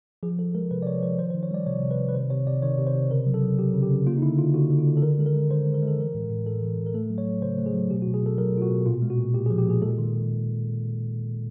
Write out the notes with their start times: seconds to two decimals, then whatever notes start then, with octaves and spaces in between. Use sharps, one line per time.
0.23 F3 G#4
0.39 F3 A4
0.55 G#3 A#4
0.71 C3 B4
0.83 D5
0.87 F3 C#5
1.03 F3 C5
1.18 D#3 C5
1.30 C5
1.35 D#3
1.43 C#5
1.51 G3 D5
1.66 C3 C#5
1.82 C3
1.91 B4
1.99 D#3
2.09 B4
2.15 C3 C5
2.30 C3 C#5
2.47 C3 D5
2.62 D#3 C#5
2.78 C3
2.87 C5
2.95 C3
3.11 C#3 A#4
3.27 F#3
3.34 A4
3.42 F#3
3.59 F#3 G4
3.74 C#3
3.82 G4
3.90 C#3
4.07 A#3 F4
4.18 D#4
4.22 D3 E4
4.39 D3 F4
4.54 D3 F#4
4.70 D3
4.78 F4
4.86 D3
4.97 A4
5.02 D#3 A#4
5.18 G#3 A4
5.26 A#4
5.35 G#3
5.51 D#3 C5
5.66 G#3
5.74 A#4
5.82 G#3
5.88 A4
5.99 E3 A#4
6.15 A2
6.30 A2
6.46 A2 A4
6.63 E3
6.78 A2
6.87 A#4
6.94 A3 A4
7.10 F#3
7.18 C#5
7.26 F#3
7.42 C#3 C5
7.58 A3
7.66 G#4
7.74 F#3
7.90 B2 G4
8.02 F#4
8.07 B2
8.14 G#4
8.22 B2 A4
8.38 F#3 A#4
8.54 B2 F4
8.62 F#4
8.70 B2
8.86 A#2 F4
9.02 G#3
9.10 F#4
9.18 A#2
9.34 A#2 G4
9.46 G#4
9.50 F3
9.58 G4
9.66 A#2 G#4
9.82 G#3 A4
9.98 D#3